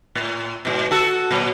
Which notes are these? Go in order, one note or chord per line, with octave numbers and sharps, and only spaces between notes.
A2
G#2 B2
F#4 A4
A#2 F#3